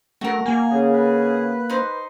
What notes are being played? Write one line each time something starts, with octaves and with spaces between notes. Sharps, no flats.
A3 F#4 A#4
A#3 G#5
C#3 G#4
B4
D#4 C5